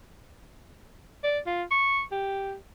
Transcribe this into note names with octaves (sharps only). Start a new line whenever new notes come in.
D5
F4
C#6
G4